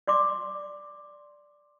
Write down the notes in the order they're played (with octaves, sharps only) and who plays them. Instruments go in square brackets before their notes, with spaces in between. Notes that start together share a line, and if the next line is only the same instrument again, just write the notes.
[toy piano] D5 C6 D6